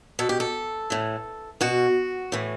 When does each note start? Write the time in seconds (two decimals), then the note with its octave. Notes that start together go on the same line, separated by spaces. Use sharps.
0.19 B2 A4
0.29 G4
0.40 A4
0.90 A2 E3
1.61 B2 F#4
2.32 A2 E3